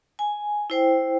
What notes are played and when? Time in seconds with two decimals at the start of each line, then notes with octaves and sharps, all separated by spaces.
0.19 G#5
0.70 E4 C5 G5